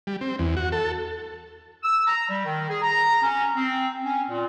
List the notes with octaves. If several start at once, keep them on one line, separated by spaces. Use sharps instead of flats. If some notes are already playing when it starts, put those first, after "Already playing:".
G3
C4
E2
F#4
A4
E6
A#5
G3
D#3
G#4
A#5
C#4
C4
C#4
A#2